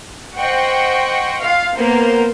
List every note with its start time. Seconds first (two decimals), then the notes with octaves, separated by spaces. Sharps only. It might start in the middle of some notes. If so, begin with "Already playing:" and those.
0.38 C5 D#5 F#5 G5 C#6
1.41 F4 F5
1.76 A#3 B3 A#4 C5